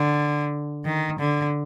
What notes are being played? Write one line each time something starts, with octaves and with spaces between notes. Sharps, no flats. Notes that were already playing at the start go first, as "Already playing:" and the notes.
Already playing: D3
D#3
D3